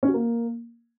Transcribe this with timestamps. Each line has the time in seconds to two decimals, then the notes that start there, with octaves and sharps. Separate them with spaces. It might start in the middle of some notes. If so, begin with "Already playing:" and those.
0.03 C#4
0.08 F#4
0.14 A#3